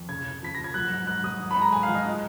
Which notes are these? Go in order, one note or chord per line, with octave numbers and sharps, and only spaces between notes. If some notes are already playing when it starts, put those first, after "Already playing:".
Already playing: F2
C#3 G#6
C#3
F3 B6
F3 A#6
G#6
F#3 F#6
G#2
G#2 F#6
F#3 D#6
G#2
B5
G#3
A#5
G#2 G#5
F5
F3
D#5
G#3